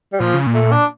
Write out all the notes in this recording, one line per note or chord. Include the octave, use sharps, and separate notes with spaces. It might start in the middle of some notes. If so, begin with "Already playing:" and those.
G3
A#2 F3
C#3
A#2
A3
D4